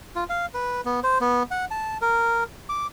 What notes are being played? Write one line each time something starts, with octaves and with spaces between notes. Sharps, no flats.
F4
F5
B4
B3
C5
B3
F#5
A5
A#4
D6